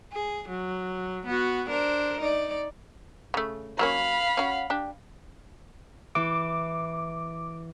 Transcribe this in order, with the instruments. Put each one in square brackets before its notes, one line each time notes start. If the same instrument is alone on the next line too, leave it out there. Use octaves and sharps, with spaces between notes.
[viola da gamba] G#4
F#3
B3 F#4
D4 A#4 C5
D#4 D5
[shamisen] C#3 A3
[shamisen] F#3 A#3 C#4 [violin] F5 B5
[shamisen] C#4 F#4
D4 G4
[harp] E3 [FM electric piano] D6